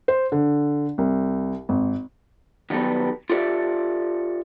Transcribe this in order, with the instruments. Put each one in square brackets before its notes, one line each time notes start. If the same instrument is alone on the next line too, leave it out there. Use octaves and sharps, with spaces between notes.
[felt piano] C5
D3
C2
G#1
[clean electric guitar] D#3 F#3 G3 B3 A4 B4
F4 G4 A4 C#5 D5 E5